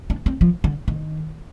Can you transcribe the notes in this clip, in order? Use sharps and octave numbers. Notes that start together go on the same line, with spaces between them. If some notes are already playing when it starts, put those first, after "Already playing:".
D4
C4
F3
D3
D#3